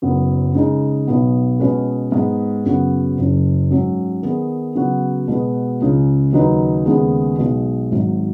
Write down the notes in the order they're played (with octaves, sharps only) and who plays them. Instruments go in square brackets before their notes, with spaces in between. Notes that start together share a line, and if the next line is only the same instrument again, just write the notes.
[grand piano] F#1 F#2 C#3 F#3 B3
C#3 G#3 D#4
B1 B2 B3
B2 G#3 C#4 G#4 B4
G#2 G#3 B3
F#2 C#3 B3 F#4
F#1 F#2 C#3
G#2 F#3 C#4
D#3 B3 G#4
C#3 F#3 B3 F#4
B2 G#3 B3 F#4 B4
C#2 C#3 G#3
D#2 C#3 F#3 D#4 B4
D#2 C#3 G#3 B3 G#4
B1 B2 G#3
G#1 G#2 F#3